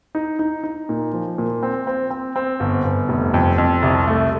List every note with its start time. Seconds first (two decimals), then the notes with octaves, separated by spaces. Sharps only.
0.15 D#4
0.39 D#4
0.63 D#4
0.89 A#2
1.13 F3
1.38 A#2
1.63 C4
1.87 C4
2.10 C4
2.36 C4
2.60 G1
2.84 G1
3.09 F1
3.34 F2
3.58 F2
3.82 C2
4.08 A3